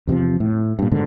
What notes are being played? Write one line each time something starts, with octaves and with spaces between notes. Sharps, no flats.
E2 C3 E3 F3
A2
G2 A#2
G#2 B2 D3 D#3